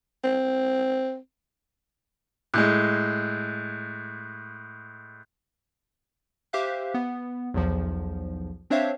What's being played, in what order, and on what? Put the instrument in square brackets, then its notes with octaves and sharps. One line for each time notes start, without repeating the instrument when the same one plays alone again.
[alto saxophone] C4
[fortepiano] A2 G#3 [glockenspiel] F#6 G6
[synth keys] G4 C5 E5 F5 F#6
B3
B1 E2 F3
C4 D4 C5 C#5 E5 F5